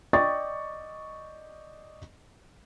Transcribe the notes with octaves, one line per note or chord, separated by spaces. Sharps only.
D5 D#5 G5 C#6 A6